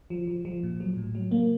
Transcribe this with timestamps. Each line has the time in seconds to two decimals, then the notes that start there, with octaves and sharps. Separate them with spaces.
0.10 F3
0.28 F3
0.45 F3
0.63 A#2
0.80 F#3
0.97 A2
1.15 F#3
1.31 C3 A#3